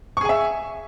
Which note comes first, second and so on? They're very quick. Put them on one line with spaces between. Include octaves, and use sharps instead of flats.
C#6 G#4 G#5 E5